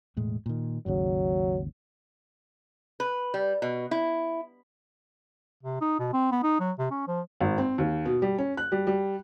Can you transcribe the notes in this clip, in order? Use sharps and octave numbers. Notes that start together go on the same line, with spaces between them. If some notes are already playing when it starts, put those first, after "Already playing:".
E1 A2 G#3
A#2 D#3
G#1 D#2 C#3 F#3
B4
G3
B2
E4
C3
D#4
B2
C4
B3
D#4
F#3
C3
C#4
F3
G#1
C4
D#2
B2
G3
C#4
F#6
G3
G3